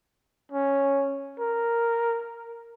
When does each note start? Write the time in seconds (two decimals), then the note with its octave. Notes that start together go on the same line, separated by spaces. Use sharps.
0.52 C#4
1.40 A#4